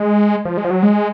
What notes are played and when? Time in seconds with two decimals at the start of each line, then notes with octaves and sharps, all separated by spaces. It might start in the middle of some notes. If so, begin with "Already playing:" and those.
Already playing: G#3
0.45 F3
0.57 G#3
0.65 F3
0.70 F#3
0.83 G#3